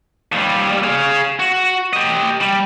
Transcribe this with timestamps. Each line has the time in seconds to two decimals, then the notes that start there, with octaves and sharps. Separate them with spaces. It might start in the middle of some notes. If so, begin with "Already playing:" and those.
0.32 D#2 G3
0.84 G#4 F5
1.39 F#4
1.93 G4 D#5
2.41 G3